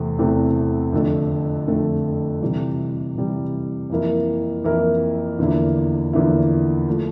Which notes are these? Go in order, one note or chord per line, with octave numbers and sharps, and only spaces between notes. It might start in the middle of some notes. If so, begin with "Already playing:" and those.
Already playing: E2 C3 E3 A3 C4
E2 C3 E3 A3 C4
F2 D3 A3
F2 D3 A3
C3 E3 G3
C3 E3 G3
F2 E3 A#3 E4 A#4
F2 E3 A#3 E4 A#4
E2 D3 F3 A#3 E4
E2 D3 F3 A#3 E4
F3 A3